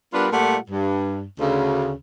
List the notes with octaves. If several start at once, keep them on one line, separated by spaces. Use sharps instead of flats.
G3 B3 D4 F4 A#4 B4
A#2 G3 A3 F4 G4 F#5
G2
D2 C#3